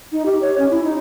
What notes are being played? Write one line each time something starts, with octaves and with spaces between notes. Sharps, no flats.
D#4
G4
C#5
C#4
E4
D#4